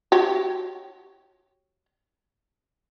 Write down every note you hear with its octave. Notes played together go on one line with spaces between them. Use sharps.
F#4 G4 C#5